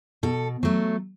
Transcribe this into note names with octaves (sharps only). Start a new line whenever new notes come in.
B2 A4
F#3 A3